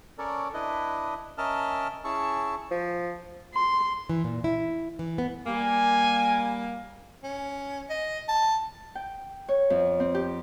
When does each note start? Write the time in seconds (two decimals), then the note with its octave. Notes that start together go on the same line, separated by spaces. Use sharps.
0.18 C#4 A4 A#4 C#5 D5
0.54 D4 E4 B4 D#5
1.38 C#4 A#4 D#5 E5 A5 F6
2.04 C#4 E4 G#4 A5 C#6 E6
2.71 F3
3.54 C6
4.09 E3
4.24 A#2
4.44 E4
4.99 E3
5.18 B3
5.46 G3 A#3 G#5
7.24 C#4
7.90 D#5
8.29 A5
8.95 G5
9.48 C#5
9.70 F2
10.00 C4
10.14 G4